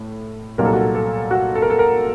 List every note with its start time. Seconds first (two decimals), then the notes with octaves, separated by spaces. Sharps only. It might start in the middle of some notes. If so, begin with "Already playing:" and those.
Already playing: A2
0.58 C2 A#2 F#3 A#3 D#4 A#4
0.65 A4
0.73 F#4
0.81 A4
0.95 A4
1.31 F#4
1.55 A4
1.62 A#4
1.70 A4
1.79 A#4